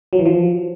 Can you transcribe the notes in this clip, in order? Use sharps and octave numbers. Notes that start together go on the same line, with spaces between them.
F#3
E3
F3